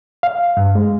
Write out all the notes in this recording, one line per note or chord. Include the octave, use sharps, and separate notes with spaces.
F5
G2
G#3